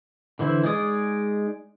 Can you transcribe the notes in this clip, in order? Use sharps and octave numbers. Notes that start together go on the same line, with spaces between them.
D3 E3 E4 C5
G#3 D#4 G#4 D5 D#6